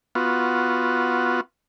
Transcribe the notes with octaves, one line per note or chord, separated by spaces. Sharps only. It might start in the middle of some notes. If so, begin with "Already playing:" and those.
B3 F4 F#4